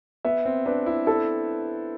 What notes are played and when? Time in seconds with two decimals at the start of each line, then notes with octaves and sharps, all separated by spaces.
0.25 B3 E5
0.45 C4
0.66 D4 B4
0.86 E4
1.07 E4 A4